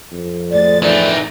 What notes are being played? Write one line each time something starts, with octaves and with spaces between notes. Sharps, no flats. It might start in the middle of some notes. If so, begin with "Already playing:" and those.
F2
A2 G#3 D5 A6
E3 D#4 D5